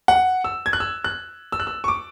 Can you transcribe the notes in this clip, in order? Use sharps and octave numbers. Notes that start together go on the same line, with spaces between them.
F#5
E6
G#6
F#6
E6
F#6
E6
F#6
E6
C#6
D6